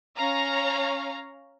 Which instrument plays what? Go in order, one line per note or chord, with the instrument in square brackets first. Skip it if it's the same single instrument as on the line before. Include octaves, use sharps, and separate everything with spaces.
[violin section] C#4 C#5 F5 A#5